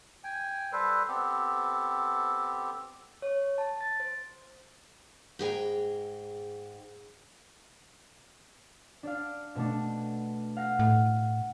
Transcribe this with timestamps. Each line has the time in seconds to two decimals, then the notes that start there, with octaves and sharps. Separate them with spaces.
0.24 G5 G#5
0.72 G3 A4 B4 C5
1.08 B3 C4 G4 A4
3.22 C#5
3.58 A5
3.81 A6
4.00 C5
5.39 G#2 G#4 G5 A#5
9.03 D4 D5 F5
9.55 B2 A3 D4
10.57 F5 F#5 A#6
10.79 A2